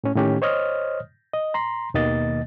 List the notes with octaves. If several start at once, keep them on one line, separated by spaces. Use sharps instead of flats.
A2 C#4
A2 D#3 C#4 G4
C5 C#5 D#5 D#6 F6
D#5
A#5 C6
D#2 B2 D#3 A#3 D#5 A6